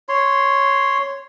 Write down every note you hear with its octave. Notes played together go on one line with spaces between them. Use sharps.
C#5 C6